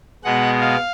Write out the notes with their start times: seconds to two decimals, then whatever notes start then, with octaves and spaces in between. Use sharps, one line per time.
0.24 B2 G#3 B3 F#5
0.60 F5